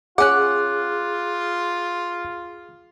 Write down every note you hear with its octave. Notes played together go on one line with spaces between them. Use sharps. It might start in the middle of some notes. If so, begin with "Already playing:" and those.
C#4 F4 G#4 F#5 D6 F#6